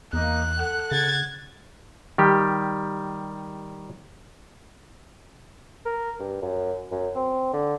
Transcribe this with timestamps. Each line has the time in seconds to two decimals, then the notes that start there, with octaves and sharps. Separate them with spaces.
0.13 E2 A#3 D#4 F#6
0.59 A4 F#5
0.91 C#3 G#6 A6
2.18 D#3 G3 G4
5.86 A#4
6.20 G2
6.42 F#2
6.91 F#2
7.15 C4
7.53 D3